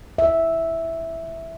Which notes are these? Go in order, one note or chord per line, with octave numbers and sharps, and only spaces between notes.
E5